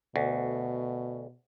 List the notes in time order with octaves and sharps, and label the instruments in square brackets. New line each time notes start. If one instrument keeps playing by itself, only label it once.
[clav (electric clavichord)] D2 [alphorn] B2